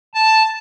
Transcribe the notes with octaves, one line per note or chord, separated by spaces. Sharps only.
A5